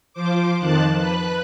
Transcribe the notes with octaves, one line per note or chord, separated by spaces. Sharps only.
F3 C5 D6
F2 D#3 A5 F#6
B4 F#6